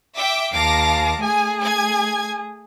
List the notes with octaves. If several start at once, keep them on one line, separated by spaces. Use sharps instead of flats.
E5 G5 D6
D#2 F5 A5 D6 A#6
A3 G#4 G#5
G#5 G#6